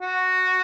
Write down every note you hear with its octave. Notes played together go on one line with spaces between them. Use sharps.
F#4